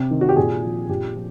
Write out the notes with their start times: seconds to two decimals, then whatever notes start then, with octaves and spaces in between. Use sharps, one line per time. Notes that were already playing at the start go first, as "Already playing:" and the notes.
Already playing: C3 G4
0.11 D#3
0.21 F#4
0.29 G4
0.36 A#2 G#4
0.63 F3
0.89 A#2 G4
1.15 F3